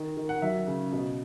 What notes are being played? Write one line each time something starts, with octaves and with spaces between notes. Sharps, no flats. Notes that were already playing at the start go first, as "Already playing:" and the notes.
Already playing: D#3
D#3
F#5
F#3 E5
C#3
B2